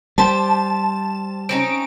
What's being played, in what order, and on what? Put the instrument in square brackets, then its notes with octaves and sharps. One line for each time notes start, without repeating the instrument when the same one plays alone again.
[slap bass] G3 [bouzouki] G4 C5 [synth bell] A5
[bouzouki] C4 C#4 D#4 [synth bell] D7